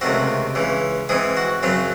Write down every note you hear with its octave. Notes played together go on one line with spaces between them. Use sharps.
C#2 C3 D#3 A3 C4 F#4
C#2 C#3 E3
G#2 E3 C4 G#4
F#4
F#2 C#3 F#3 C4